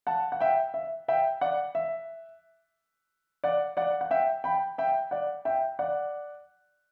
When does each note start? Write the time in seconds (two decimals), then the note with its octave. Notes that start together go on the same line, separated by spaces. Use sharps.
0.07 F#5 A5
0.32 F#5
0.41 E5 G5
0.74 E5
1.08 E5 G5
1.41 D5 F#5
1.75 E5
3.44 D5 F#5
3.77 D5 F#5
4.01 F#5
4.11 E5 G5
4.44 G5 B5
4.78 E5 G5
5.11 D5 F#5
5.45 E5 G5
5.79 D5 F#5